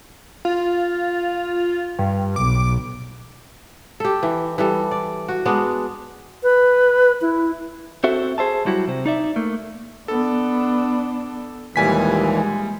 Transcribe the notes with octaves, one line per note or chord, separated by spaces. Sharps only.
F4
G2
B1 D6
G4 A4
E3
E3 G3 A4
D5
F#4
G#3 B3 D4
B4
E4
C4 F#4 A4 C5 E5
G#4 C5 E5 A5
F#3 G3 E4 F#4
C3 C5
D#4 D5 E5
A3 A#3
B3 D4 A4
D#2 A#2 E3 G3 G#3 G#5 B6